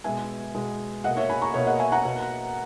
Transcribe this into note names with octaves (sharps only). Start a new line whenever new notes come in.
B2 G#3 B3 E5 G#5
B2 G#3 B3
B2 A#3 D#5 F#5
C#5 E5
G#5 B5
A#5 C#6
B2 A#3 C#5 E5
D#5 F#5
E5 G#5
F#5 A#5
B2 A#3